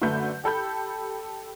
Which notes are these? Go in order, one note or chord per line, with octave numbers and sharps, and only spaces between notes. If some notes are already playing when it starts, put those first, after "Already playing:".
F#2 D3 A3 B4 G6
G4 A4 B5 G6